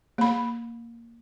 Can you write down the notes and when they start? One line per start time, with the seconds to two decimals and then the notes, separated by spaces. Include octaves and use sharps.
0.18 A#3 B5